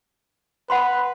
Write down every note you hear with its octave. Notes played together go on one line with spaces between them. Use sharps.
B4 F#5 B5 C6